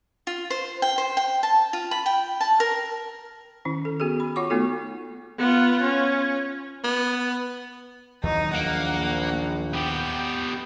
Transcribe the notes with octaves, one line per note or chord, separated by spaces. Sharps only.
F4
C5
G5
C5
G5
A5
F4
B5
G5
A5
A#4
D#3 C#4 E4
A4
B3 F#4 G#4 A4
B5
F4 C#5 F#5 C#6 D6
A3 B3 D#4 F4 F#4 A4
B3 F4
C#4
B3
D#2 E3 F#3 D#4
A#1 A#3 F#5
B3 G4 G5